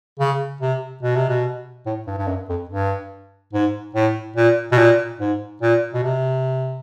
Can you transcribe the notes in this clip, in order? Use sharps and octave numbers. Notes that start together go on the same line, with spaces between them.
C#3
C3
B2
C3
B2
A2
G2
G2
F#2
F2
G2
G#2
A2
A#2
B2
A#2
G#2
A#2
B2
C3